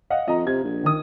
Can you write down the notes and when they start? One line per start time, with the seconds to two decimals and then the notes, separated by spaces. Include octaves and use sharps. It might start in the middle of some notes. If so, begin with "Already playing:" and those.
0.10 D#5 F5 F#5
0.28 F2 D#5 A#5
0.47 C3 G#6
0.64 A#1
0.84 D#3 D#6